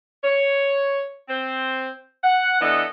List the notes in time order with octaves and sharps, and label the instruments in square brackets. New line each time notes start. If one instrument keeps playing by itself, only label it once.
[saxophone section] C#5
C4 C5
F#5
E3 B3 D4 A4 D#5